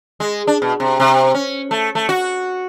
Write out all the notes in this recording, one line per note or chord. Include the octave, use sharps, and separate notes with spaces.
G#3
D4
B2
C3
C3
C#4
A3
A3
F#4